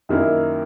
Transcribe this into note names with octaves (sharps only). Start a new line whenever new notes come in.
F#2 D#3 A#3 E4 A#4